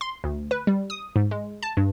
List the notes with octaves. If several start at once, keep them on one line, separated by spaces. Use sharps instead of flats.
C6
D2
B4
G3
D#6
G#2
G#3
A5
G2